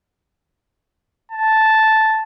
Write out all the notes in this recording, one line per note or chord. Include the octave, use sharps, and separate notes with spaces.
A5